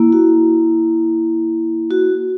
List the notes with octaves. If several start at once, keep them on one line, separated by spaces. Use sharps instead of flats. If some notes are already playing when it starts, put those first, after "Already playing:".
Already playing: A#3 E4
F#4
F#4